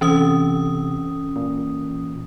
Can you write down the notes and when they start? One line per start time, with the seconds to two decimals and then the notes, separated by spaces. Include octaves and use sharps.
0.01 C3 E3 C#4 D#6
1.36 A#2